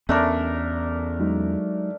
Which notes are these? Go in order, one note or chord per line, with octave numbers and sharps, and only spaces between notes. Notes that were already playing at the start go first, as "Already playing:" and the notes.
E2 A3 B3 C#4 D4 A#4
F#3 G#3 D#4